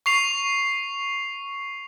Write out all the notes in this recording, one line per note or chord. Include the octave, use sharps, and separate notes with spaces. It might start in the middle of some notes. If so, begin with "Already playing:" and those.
C#6 C7 F7